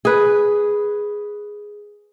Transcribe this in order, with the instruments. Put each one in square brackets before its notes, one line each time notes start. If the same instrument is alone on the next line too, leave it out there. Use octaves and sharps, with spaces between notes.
[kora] G#4 B4